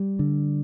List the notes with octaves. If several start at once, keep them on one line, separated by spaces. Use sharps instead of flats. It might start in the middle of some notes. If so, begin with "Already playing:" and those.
Already playing: G3
D3